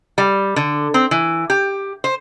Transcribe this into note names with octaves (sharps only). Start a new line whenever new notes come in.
G3
D3
C4
E3
G4
C5